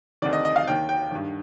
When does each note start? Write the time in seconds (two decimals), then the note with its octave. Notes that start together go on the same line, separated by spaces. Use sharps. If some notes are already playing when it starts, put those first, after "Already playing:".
0.22 D2 C3 D#3 D5
0.33 D#5
0.45 D#5
0.56 F5
0.68 D#2 D#3 G5
0.89 G5
1.11 G2 D#3